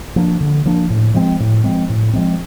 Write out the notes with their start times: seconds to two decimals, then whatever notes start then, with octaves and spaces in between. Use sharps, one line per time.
0.16 F3 A#3 D4
0.41 D3
0.65 F3 A#3 D4
0.90 A2
1.14 F3 G#3 C4
1.40 A2
1.64 F3 G#3 C4
1.89 A2
2.13 F3 G#3 C4